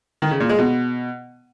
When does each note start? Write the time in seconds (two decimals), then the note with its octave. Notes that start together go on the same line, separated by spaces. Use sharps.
0.22 D#3
0.31 C#3
0.40 A#2
0.49 G#3
0.59 B2